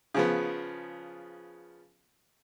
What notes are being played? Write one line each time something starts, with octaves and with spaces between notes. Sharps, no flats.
C#3 F3 B3